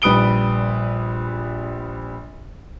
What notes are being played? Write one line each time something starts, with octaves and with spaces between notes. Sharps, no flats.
A#1 G3 B4 D#6 D7 G7